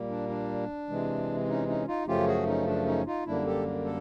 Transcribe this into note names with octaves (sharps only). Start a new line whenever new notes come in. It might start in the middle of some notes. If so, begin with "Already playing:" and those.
Already playing: A#2 G3 A#3
D4
D4
C3 E3 G#3
C#4 D#4
C#4 D#4
D#4 F4
F#2 C#3 F3 A3 C#4 F4 G4
F#4 G#4
C#4 D#4
D4
C#4 D#4
D#4 F4
F#2 D3 G3 A#3 D4 E4
G4 A4
A4